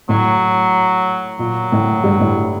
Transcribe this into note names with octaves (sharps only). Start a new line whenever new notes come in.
A2 F#3
A#2 F#3
A2
G2
A2